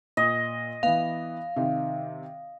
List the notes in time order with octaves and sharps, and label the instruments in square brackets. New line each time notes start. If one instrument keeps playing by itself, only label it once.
[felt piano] A#2 [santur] D#5
[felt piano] E3 B3 [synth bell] F5
[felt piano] C3 D#3